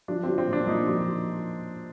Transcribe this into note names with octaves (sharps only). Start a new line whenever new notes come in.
F3 D4
F3 C4
C4
A#2 D4
A#2 D#4
F3